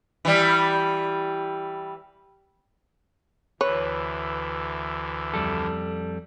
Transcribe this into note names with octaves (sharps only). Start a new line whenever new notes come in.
E3 G3
D2 E3 B4 C#5
F2 G3 A4